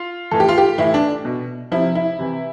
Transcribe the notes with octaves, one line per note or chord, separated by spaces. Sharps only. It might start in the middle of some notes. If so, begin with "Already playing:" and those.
Already playing: F4
A2 E3 A4
G4
F4
G4
A2 E3 E4
D4
B2
C3 F3 E4
E4
C3 E3